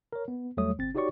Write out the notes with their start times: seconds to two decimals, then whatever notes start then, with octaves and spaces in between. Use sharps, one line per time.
0.13 A#4 C#5
0.28 B3
0.57 E2 F#3 G3 A3 C#5 D#6
0.78 G1 C4 A6
0.95 D#4 F#4 G4 C#5 D5 C#6